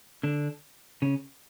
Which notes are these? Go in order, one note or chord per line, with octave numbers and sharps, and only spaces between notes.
D3 D4
C#3 C#4